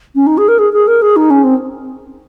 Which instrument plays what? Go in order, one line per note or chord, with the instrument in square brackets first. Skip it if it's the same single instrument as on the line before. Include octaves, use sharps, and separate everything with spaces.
[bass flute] C#4
D#4
G#4
A#4
G#4
G#4
A#4
G#4
D#4
C#4
C4